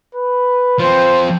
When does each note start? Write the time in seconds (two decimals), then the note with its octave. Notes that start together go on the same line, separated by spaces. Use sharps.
0.15 B4
0.79 F3 C4 C5